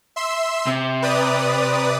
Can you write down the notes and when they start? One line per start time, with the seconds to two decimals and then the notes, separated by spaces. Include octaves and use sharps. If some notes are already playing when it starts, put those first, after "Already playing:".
0.16 E5 C6 E6
0.67 C3
1.02 B4 D5 D#6